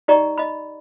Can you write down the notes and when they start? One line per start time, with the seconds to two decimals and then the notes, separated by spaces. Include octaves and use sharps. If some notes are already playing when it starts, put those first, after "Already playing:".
0.08 D#4 G4 D5 D#5 A#5 C#6
0.38 D#5 B5